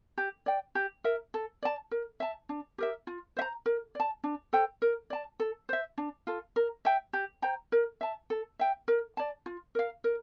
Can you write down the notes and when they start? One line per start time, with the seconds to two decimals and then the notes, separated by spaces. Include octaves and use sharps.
0.18 G4
0.46 D5 G5
0.75 G4
1.04 A#4 E5
1.34 A4
1.63 D5 A5
1.91 A#4
2.20 E5 A5
2.49 D4
2.78 G4 A#4 E5
3.07 F4
3.37 C5 E5
3.42 A#5
3.66 A#4
3.95 D5 A5
4.24 D4
4.53 A4 C5 G5
4.82 A#4
5.10 D5 A5
5.40 A4
5.69 C5 E5
5.98 D4
6.27 F4 A4
6.56 A#4
6.85 E5 G5
7.13 G4
7.42 C5 G5 A#5
7.72 A#4
8.01 E5 A5
8.30 A4
8.59 E5 G5
8.88 A#4
9.17 D5 A5
9.46 F4
9.75 A#4 F5
10.04 A#4